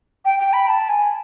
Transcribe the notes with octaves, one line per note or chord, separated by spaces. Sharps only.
G5
G5
B5
A5
G#5